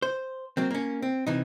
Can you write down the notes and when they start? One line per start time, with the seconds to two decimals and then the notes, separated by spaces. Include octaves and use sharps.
0.02 C5
0.57 F#3 A#3 C4
0.71 A#3 C#4
1.02 C4
1.27 C3 E3 D#4